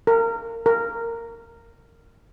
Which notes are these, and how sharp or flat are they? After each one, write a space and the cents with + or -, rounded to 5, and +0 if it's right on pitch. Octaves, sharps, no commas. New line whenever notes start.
A#4 -25
A#4 -15